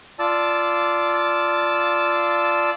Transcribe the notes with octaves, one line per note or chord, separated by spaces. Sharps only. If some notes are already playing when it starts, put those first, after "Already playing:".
F4 D5 A5 E6